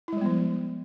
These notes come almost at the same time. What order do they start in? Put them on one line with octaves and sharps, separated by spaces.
E4 G#3 G3 B3 F3